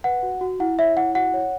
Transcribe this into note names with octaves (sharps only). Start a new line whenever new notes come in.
B4 F#5
F#4
F#4
E4 F#5
C#5 E5
E4 F#5
F#4 F#5
C#5